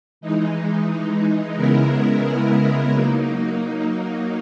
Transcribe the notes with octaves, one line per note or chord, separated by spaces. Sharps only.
E3 G#3 D#4
C#3 G#3 B3 E4 A#4
F#3 A#3 D#4